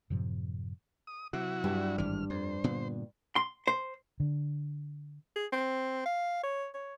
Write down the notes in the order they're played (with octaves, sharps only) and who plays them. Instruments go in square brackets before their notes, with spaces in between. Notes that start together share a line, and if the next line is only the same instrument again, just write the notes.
[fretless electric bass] F#2 A2 C3 F3
[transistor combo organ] D#6
[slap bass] C3 [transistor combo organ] F#3 E4 F#4
[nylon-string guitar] G2 G3 D4
[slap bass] G#1 E3 [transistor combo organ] F6
[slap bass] F2 [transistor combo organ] C5
[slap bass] A#2 D3 B3
[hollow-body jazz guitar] C6
C5
[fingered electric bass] D3
[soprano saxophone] G#4
C4
F5
C#5
C#5